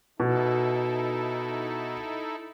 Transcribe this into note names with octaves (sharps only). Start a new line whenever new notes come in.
B2 D#4 E4 A4